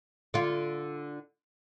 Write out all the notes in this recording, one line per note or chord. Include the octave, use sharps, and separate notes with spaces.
D3 F4